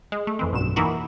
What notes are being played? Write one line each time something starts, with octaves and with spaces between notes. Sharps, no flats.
G#3
A3
F2 E3 C4
B1 G2 B2 E7
E3 A#3 D#4 E4 F#4